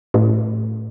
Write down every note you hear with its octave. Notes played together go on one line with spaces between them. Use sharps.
A2